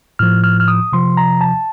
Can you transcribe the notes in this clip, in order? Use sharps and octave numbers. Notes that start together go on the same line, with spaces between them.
A2 F3 F6
F6
F6
D#6
C3 F3 C6
A#5
A5